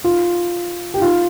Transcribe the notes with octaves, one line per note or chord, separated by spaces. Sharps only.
F4
G4
F4